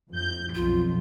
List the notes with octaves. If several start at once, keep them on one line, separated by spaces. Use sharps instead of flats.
F2 G6
B1 F2 F4